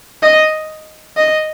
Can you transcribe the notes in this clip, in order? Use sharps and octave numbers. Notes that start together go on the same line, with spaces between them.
D#5
D#5